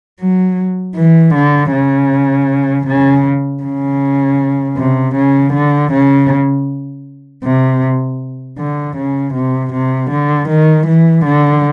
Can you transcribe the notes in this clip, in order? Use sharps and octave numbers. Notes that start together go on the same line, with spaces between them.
F#3
E3
D3
C#3
C#3
C#3
C3
C#3
D3
C#3
C3
D3
C#3
C3
C3
D3
D#3
E3
D3